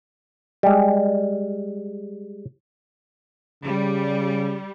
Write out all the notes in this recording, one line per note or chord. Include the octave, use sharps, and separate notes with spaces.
G3 G#3
C#3 G3